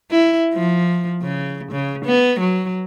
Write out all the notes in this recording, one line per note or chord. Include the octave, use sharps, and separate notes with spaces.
E4
F3
C#3
C#3
B3
F#3